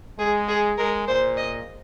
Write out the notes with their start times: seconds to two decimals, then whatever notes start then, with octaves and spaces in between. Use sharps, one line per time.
0.19 G#3 G#4
0.48 G#4
0.78 G#3 A#4
1.08 A#2 C5
1.37 D#5